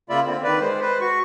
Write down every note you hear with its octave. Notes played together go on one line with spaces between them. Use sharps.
C#3 A#3 F4 D5 E5 B5
D3 C4
D#3 B4 D5
G#3 C5
B4 C5
F#4 C#6